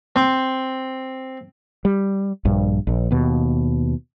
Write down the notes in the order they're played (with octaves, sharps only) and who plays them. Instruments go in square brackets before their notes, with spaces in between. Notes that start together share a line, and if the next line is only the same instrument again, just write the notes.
[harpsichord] C4
[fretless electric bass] G3
A#1 G2
A#1
D#2 B2